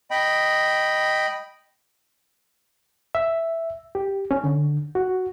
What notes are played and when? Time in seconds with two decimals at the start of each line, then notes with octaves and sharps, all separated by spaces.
0.11 D#5 G5 B5
3.15 E5
3.95 G4
4.31 C#4
4.44 D3
4.95 F#4